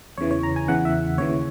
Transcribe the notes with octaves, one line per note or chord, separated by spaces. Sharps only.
E2 C#3 E3 C#5
C#5
A#5
G#5
E2 C#3 E3 F#5
E5
D#2 C#3 E3 C#5